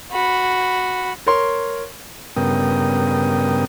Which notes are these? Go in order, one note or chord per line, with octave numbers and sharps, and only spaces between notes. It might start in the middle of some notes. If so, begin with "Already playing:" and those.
F#4 B5
A#4 C#5 C6
G2 C#3 B3 A#4 G5 D#6